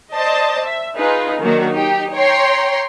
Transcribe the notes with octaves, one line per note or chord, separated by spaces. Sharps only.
C5 D5 D#5 A5
E5
D#4 F4 G#4 B4
D#3 F#3 A#3 D4 F#4
D#4 G4
C#5 G5 A#5 C6